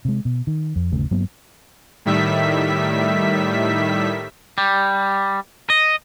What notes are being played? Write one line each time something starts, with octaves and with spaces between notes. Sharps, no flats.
C3 G#3
B2
D#3
F2
G1 D#2 C#3 A3
G2 F#3 A#3 B3
A2 D#3 G3 E5 B6
G3
D#5